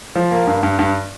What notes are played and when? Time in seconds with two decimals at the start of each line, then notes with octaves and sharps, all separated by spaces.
0.15 F3
0.31 A#3
0.47 G2
0.63 G2
0.79 G2